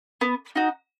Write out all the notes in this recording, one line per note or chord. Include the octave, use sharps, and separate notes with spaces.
B3
D#4 F#4